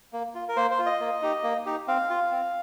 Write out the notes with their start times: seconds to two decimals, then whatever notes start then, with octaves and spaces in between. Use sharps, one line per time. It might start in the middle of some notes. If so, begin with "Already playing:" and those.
0.13 A#3
0.35 F4
0.48 A#4
0.56 A#3 C5
0.71 C5
0.79 F4
0.86 D#5
1.00 A#3
1.22 D#4 G4
1.43 A#3
1.66 D#4 G4
1.88 C4 F5
2.10 F4
2.31 C4